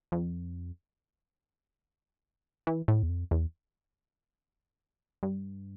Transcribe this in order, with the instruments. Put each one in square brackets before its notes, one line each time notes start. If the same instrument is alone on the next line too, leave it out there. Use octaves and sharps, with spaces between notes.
[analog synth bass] F2
E3
A2
E2
F2
E2
G2